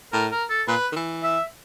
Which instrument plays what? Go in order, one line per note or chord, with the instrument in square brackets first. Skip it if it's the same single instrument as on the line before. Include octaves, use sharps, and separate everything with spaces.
[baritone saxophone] A2 [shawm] A#4
[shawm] A#4
A4
[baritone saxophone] A#2 [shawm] B4
[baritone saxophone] D#3
E3
[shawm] E5